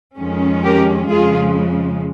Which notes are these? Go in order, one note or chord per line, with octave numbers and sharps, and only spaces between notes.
F2 D#3 G#3 C#4
G4 A#4
F2 C#3 F3 G#3 F4 G#4